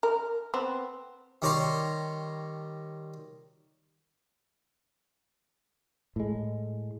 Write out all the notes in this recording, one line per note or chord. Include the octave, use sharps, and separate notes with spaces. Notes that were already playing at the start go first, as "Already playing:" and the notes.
A#4
B3 C4
D#3 G3 C#5 A#5 C6
A2 G#3